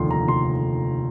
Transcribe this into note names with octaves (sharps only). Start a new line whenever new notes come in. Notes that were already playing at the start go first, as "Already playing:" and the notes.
Already playing: F1 D#2 D3 F3 C6
A#5
F1 C6